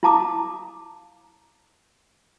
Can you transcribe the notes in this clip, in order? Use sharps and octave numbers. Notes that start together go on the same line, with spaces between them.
E4 F5 A5 A#5 D6 D#6